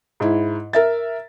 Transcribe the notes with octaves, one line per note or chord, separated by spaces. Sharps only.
G#2 E4
A#4 E5 A6